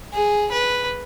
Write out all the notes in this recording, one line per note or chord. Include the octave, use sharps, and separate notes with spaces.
G#4
B4